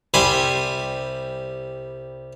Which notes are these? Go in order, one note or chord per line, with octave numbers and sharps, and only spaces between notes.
C2 G3 C5 G#5 B5